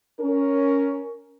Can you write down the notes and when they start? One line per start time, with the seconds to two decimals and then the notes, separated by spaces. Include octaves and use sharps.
0.20 C#4 A#4